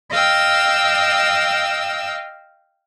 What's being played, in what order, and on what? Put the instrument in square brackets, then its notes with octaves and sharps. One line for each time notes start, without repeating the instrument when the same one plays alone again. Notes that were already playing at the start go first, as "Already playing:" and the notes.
[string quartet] D#5 F5 G5 E6